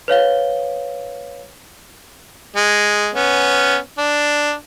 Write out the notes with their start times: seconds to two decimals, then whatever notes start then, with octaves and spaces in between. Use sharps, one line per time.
0.08 B4 C#5 F5 G7
2.56 G#3
3.14 B3 C#4
3.98 D4